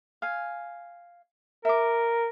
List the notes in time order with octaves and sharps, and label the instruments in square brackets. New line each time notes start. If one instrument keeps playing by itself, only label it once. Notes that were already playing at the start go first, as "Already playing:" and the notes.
[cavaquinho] F5 G#5
[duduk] A#4 [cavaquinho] E5 D6